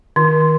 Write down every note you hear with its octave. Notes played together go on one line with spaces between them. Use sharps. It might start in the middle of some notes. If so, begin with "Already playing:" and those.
D#3